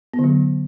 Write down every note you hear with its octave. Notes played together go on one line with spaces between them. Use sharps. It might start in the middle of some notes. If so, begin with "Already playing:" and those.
B3
D3
F#3